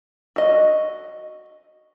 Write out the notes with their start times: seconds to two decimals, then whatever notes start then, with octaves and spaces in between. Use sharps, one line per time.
0.36 F#4 D#5